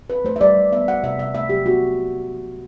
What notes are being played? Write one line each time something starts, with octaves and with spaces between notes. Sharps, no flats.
C4 B4
A3 C5
E5
G3 D5
G3
B3 E5
B3 F#5
C3 E5
C3 E5
A3 E5
F#3 G4
B3 F#4